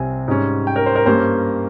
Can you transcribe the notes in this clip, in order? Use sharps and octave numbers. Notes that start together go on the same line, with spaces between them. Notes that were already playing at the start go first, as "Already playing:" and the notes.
Already playing: C2 C3 G3 C4 G#5
G#2 G3 C#4
G5
A#4
C5
A#4
G2 G3 A#3 C#4 C5